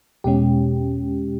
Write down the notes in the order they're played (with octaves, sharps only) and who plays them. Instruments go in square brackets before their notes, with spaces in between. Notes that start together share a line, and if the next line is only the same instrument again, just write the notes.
[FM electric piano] E2 B2 G#3 C#4 G4